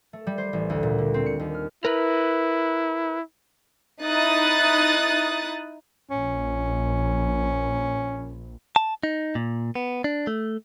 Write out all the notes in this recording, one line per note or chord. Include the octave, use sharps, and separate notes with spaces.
A3
G3
C5
A1
D2
A#2
D3
C4
C#7
D#2
F6
E4 A#4 B4
D#4 E4 D#6 F#6 A6
A#1 C#4
A5
D#4
A#2
B3
D4
A3